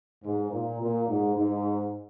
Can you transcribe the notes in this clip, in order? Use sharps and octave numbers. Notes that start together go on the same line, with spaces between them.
G#2
A#2
A#2
G#2
G#2